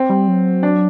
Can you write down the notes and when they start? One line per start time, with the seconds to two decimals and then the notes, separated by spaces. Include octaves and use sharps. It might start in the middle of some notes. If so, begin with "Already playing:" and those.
Already playing: C4
0.10 G3
0.28 F#3
0.63 D4